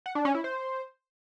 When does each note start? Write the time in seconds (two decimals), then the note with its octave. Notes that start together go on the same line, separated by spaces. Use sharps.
0.06 F#5
0.15 D4
0.25 C#4
0.34 E4
0.44 C5